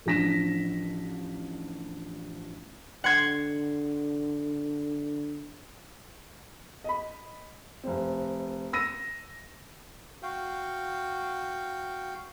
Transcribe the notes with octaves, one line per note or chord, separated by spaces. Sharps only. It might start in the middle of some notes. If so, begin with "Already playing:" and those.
A1 F3 D4 A#6 B6 E7
D3 F#5 C6 G#6
D#5 B5
F1 C4
E6 A#6 D#7
F#4 F5 G5